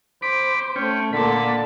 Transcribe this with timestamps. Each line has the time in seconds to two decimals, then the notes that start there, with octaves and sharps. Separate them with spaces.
0.22 C5 B5 D6
0.76 A3 C#4 G5
1.13 A#2 D3 A#3 A5 B5